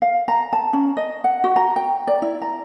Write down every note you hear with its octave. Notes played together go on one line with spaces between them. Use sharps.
F5
A#5
A5
C#4
D#5
F#5
F#4
A#5
G5
D5
E4
A#5